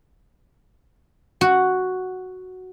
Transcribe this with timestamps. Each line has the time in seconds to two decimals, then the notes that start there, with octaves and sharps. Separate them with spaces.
1.41 F#4